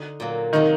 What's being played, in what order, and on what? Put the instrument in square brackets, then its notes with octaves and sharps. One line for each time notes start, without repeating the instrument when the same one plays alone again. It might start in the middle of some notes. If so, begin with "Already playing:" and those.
Already playing: [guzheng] D3 D#4
A#2 F#3 A#3
[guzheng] C3 F#3 A#3 D#4 [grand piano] D#3